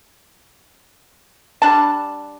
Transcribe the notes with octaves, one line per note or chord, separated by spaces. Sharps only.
G3 D4 A5